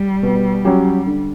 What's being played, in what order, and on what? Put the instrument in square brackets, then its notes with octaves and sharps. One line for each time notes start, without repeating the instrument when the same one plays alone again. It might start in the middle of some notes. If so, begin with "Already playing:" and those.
Already playing: [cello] G3
[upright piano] B2
F#3 C#4 G4
D3